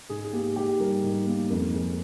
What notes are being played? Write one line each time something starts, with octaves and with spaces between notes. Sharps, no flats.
G#2 G#4
G#4
A#3 G4
G#2 G4
G3 A#4
G#2
A#3
F2 A#4
G#3